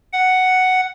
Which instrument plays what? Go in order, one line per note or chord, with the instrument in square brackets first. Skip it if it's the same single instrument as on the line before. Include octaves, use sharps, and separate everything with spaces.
[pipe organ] F#5